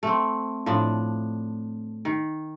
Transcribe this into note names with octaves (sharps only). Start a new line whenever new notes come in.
A3 C4
A2 F3 D4
D#3